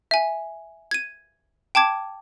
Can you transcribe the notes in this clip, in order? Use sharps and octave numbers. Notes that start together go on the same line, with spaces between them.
E5 G#5
G#6 D#7
G5 A5 D6 G#6